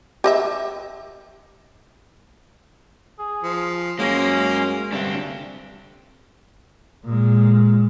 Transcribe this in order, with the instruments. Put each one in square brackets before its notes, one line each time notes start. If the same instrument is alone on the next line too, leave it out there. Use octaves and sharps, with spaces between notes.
[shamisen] G4 D#5 E5
[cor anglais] G#4
[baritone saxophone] F3
[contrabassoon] F#2 [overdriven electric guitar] G#3 [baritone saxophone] A#3 [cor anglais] C#4
[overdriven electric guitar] D2 D4 [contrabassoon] G2 [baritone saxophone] C3
[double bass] A#2 G#3